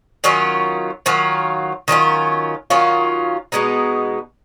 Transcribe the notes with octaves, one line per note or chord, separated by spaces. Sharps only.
D#3 F#3 C#4 F4
D#3 F#3 C#4 F4
D#3 F#3 C#4 F4
D#3 F#3 C#4 F4
B2 G#3 B3 D#4